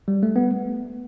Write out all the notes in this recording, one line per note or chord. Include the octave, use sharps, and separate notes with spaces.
G3
A3
B3